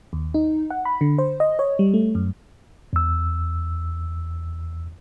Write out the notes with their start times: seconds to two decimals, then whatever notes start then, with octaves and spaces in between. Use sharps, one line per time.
0.13 D#2
0.34 D#4
0.70 F#5
0.85 B5
1.01 D3
1.18 C5
1.40 D#5
1.59 C#5
1.79 G3
1.94 A3
2.15 F#2
2.93 E2 E6